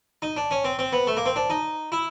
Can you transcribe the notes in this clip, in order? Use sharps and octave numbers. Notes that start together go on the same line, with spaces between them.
D#4
D4
C#4
C4
C4
B3
A3
A#3
C4
D4
D#4
E4